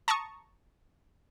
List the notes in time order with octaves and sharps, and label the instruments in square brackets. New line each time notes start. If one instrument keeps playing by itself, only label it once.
[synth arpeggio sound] A5 A#5 C#6 D#6